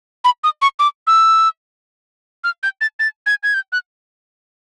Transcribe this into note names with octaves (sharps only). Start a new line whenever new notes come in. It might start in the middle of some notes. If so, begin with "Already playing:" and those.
B5
D#6
C#6
D6
E6
F6
G6
A6
A6
G#6
G#6
G6
F#6